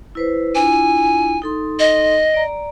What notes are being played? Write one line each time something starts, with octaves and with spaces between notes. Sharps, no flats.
E4 B4 C5
D4 E4 F4 G#5
D#4 A4 C6
D#5
D5 A#5